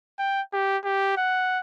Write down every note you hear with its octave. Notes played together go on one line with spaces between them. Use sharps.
G5
G4
G4
F#5